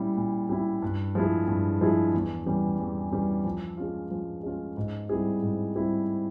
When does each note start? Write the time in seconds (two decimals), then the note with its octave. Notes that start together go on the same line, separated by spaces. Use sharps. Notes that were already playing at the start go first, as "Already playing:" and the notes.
Already playing: A#2 G3 C#4 E4
0.16 A#2
0.49 G3 C#4 E4
0.82 G2
1.15 F3 G#3 E4 G#4
1.48 G2
1.81 F3 G#3 E4 G#4
2.14 E2
2.46 E3 G3 C#4
2.79 E2
3.12 E3 G3 C#4
3.45 F3
3.77 G#3 C#4 F4
4.11 F3
4.43 G#3 C#4 F4
4.77 G#2
5.09 G3 C4 E4 G#4
5.42 G#2
5.75 G3 C4 E4 G#4